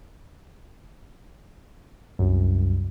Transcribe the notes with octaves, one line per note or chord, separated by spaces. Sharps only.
C2 F#2